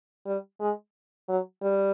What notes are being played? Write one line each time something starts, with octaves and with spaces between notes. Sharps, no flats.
G3
G#3
F#3
G3